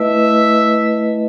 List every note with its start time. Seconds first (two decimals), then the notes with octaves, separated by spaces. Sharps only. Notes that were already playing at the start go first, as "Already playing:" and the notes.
Already playing: A3 E4 B4 D#5 E5